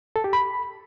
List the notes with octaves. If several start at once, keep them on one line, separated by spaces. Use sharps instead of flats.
A4
G4
B5